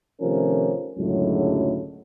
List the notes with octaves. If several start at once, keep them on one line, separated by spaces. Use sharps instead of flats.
C3 D#3 F3 A3 C#4 A#4
C#2 F#2 A2 D3 F#3 G#3